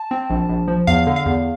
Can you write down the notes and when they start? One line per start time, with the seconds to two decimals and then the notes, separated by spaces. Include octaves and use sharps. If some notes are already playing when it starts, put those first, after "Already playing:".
Already playing: A5
0.11 C4
0.30 A#1
0.49 A#1
0.68 F3
0.87 E2 F5
1.07 D3
1.16 F5
1.26 E2